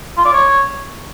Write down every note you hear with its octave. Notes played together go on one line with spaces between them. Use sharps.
F4
D5
C#5